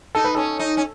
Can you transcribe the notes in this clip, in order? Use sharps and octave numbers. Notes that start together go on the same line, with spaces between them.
D#4 A4
B4
C#4 A4
D#4
C#4